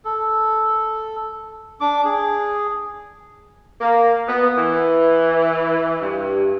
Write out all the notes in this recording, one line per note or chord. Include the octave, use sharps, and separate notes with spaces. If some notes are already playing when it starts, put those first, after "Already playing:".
A4
D4 D6
G#4
A#3
B3
E3
G2